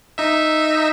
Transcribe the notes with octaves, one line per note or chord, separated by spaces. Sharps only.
D#4 E5